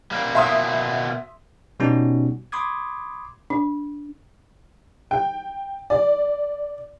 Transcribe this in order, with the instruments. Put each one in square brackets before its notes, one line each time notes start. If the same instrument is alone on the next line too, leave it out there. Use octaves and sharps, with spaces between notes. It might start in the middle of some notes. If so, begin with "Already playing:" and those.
[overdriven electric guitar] G3 A#3
[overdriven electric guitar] B2 A#3 [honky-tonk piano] E5 C6 D#6
[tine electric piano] B2 G3 B3 C#4 D#4 F#4
B5 C6 D6 D#6 G#6
[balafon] D4
[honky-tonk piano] G5
D5